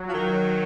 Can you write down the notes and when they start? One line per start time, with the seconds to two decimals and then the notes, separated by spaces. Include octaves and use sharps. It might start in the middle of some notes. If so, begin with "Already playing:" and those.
Already playing: F#3
0.09 F3
0.14 D#3